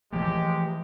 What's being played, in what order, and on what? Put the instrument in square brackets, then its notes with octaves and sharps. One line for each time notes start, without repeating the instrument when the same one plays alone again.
[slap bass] E3 F3 A3 [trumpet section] G#3 G4